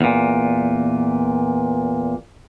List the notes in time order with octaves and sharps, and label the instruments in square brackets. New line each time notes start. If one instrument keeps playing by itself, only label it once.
[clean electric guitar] E2 A#2